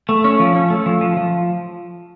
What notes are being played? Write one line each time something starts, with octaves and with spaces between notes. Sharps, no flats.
A3
C#4
F3
C#4
A3
F3
F3
F3